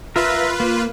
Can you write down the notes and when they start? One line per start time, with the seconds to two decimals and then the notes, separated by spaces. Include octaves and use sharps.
0.16 F4 A#4 B4 E5
0.60 A#3